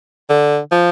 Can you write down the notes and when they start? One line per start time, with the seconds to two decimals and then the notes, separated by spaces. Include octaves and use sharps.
0.30 D3
0.72 F3